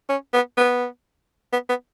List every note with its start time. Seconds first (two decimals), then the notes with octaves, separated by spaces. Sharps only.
0.09 C#4
0.33 B3
0.57 B3
1.52 B3
1.69 B3